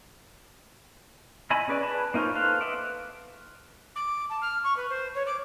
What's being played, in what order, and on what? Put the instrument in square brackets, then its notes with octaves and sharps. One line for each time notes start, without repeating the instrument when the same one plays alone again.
[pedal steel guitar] E4 D#5 G#5 B5
C#4 G#4 B4 D5
G#4 B4 A5 B5
A#3 D#4 F4 C5 C#5
A4 B4 C5 F5
D#5 E5 F#5 D6
[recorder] D6
A5
F6
C#6
B4
C5
C#5
D6